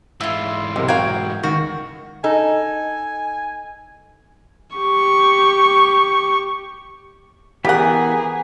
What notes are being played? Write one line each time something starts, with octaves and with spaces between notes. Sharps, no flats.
G#2 E3 E4 F4
B1 C3 G#3 A#4
F#4 A#4 F5 G5 G#6
C#2 D#3 F#4
D#4 A4 G#5
G4 C#6
C#3 E3 B3 G4 G#4 A#4 E5 F#5